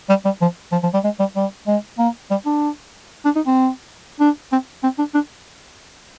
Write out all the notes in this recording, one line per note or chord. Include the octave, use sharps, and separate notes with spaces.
G3
G3
F3
F3
F3
G3
G#3
G3
G3
G#3
A#3
G3
D4
D4
D#4
C4
D4
C4
C4
D4
D4